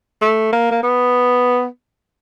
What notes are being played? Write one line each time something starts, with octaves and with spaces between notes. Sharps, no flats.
A3
A#3
A#3
B3